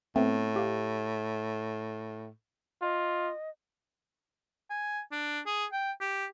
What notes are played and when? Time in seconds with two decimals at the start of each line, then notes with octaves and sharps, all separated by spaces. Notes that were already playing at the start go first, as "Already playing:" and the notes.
0.16 A2 A3 B3 C4
0.56 G4 F5
2.82 F4 D#5
4.70 G#5
5.12 D4
5.46 G#4
5.72 G5
6.01 G4